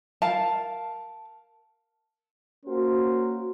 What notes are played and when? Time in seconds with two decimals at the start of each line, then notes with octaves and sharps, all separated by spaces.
0.22 A#4 F5 A5
2.66 A#3 C#4 F#4 A#4 C5